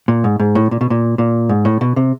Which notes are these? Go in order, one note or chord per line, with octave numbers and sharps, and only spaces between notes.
A#2
G#2
G#2
A2
A#2
B2
A#2
A#2
G#2
A2
B2
C3